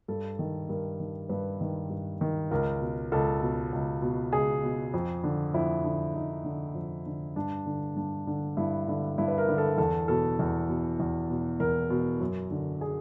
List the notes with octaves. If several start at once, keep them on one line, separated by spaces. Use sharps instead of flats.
G2 A4
D#3
G2 A#4
D#3
G2 B4
D#3
G2
D#3
C#2 A#4
B2
C#2 A4
B2
C#2
B2
C#2 G#4
B2
F2
D3
F2 E4
D3
F2 D#4
D3
F2
D3
G2 D4
D3
G2 D4
D3
G2 E4
D3
G2 E4
B4
A#4
D3
A4
E2 A4
B2 A4
E2
B2
E2
B2
E2 A#4
B2
F#2
D3
G#4